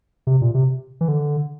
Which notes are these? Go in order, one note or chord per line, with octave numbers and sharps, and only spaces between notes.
C3
A#2
C3
E3
D3